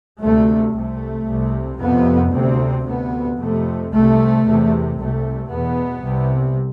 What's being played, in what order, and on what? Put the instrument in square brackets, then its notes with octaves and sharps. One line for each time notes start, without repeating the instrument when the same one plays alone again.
[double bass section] D2 C3 A3
C2 C3 A3
C2 C3
F2 C3 B3
D2 C3 C4
D2 C3 B3
F2 C3 A3
C2 C3 A3
E2 C3
C2 C3 A3
E2 B2 B3
C2 C3